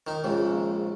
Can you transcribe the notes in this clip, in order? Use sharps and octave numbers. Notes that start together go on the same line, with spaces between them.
D#3 D#4
A#1 G#2 C#3